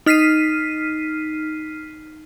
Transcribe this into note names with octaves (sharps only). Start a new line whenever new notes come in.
D#4 F6 B6 C7 D#7